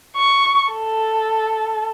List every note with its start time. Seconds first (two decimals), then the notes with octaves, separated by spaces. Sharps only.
0.17 C#6
0.72 A4